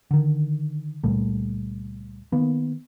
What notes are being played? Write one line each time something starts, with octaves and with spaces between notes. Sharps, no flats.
D3 D#3
C#2 A#2 G3 A3
D#3 A#3 B3